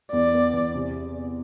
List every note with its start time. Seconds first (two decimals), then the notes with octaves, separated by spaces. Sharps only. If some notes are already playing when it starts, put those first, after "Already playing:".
0.12 E2 D5
0.33 B3
0.53 E2
0.74 C3